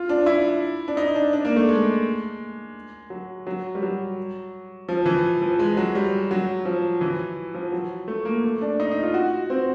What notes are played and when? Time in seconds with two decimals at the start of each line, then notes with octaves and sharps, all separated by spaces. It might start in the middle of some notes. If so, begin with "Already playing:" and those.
Already playing: F4
0.09 D4
0.26 E4
0.88 D4
0.97 D#4
1.15 D4
1.33 D4
1.45 A#3
1.56 A3
1.69 G#3
3.10 F#3
3.47 F#3
3.75 G3
3.82 F#3
4.89 F3
5.06 E3
5.42 F3
5.59 G#3
5.77 F#3
5.95 G3
6.31 F#3
6.65 F3
7.01 E3
7.54 F3
7.72 F#3
8.08 A3
8.25 A#3
8.44 A3
8.61 D4
8.80 D#4
8.92 D#4
9.03 F4
9.14 F#4
9.50 C4